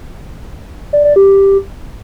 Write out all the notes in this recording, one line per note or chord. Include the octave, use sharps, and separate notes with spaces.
D5
D5
G4